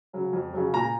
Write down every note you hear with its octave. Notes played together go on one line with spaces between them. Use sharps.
C#3 F#3
F2
C#3 F#3
A#2 A#5